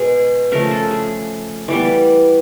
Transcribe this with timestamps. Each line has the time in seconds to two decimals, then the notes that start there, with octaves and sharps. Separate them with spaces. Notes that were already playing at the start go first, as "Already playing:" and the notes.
Already playing: B2 G#3 B3 G#4
0.52 C#3 F3 A3 A#4
0.71 A4
0.91 G#4
1.68 E3 G3 B3 D5